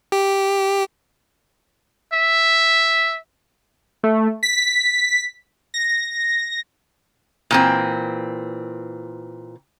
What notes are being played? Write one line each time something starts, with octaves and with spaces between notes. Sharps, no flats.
G4
E5
A3
B6
A#6
A#2 E3 C4